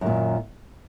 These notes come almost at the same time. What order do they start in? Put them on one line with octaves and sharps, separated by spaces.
F#2 D#3 A#2